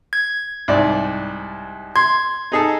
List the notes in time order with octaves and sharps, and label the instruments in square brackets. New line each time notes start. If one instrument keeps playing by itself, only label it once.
[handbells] G#6
[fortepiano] C2 G#2 D5
[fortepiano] C6 [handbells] G#6
[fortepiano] D#4 G#4 A4